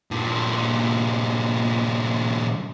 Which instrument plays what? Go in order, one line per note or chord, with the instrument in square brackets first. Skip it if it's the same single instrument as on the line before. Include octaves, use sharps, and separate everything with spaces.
[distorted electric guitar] G2 A#2